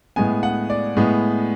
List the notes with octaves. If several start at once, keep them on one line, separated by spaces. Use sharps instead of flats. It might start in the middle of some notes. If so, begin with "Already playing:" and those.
A2 G#3 B3 G#5
F#5
D5
A2 G#3 B3